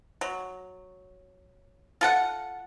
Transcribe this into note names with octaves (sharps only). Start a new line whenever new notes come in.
F#3
F4 A4 F#5